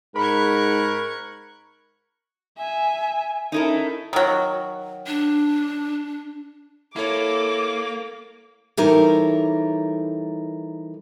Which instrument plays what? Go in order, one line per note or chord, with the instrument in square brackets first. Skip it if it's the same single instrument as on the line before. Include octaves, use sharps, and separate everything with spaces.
[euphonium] G#2 [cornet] A#4 [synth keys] B5 [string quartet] C#6 F#6 G#6
[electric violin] E5 [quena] G#5
[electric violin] C#4 A4 [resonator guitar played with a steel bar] D#4 E4 A#4
[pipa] D#3 F#3
[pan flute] D4
[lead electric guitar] A#3 [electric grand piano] E4 C#5 [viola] A4 [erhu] D6
[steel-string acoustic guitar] E3 G3 D#4 A4 A#4 C#5